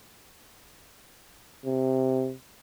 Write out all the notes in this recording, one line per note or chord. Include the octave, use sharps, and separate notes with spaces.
C3